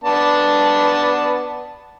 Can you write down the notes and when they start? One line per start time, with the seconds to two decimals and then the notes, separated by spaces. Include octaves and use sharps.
0.04 B3 D4 A5